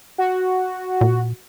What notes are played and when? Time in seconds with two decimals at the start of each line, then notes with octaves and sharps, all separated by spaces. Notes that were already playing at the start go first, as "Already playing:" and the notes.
0.18 F#4
1.01 A#2